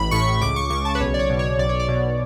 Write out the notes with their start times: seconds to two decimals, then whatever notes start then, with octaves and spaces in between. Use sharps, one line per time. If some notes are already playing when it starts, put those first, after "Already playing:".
Already playing: A1 B5
0.11 A2 C#6
0.41 C#2 D6
0.56 C#6
0.70 C#3 C#6
0.85 A5
0.95 B4
1.00 B1 C#5
1.14 D5
1.19 C#5
1.30 B2
1.39 C#5
1.59 B1 D5
1.69 C#5
1.80 D5
1.89 B2